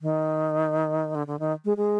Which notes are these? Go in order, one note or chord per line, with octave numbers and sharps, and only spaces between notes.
D#3
D3
D3
D#3
G#3
G#3